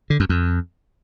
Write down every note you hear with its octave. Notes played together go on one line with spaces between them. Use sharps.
D3
F#2
F2